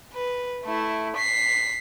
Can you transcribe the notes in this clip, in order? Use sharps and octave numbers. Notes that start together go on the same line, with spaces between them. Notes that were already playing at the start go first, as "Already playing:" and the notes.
B4
A3 E4
B6 C7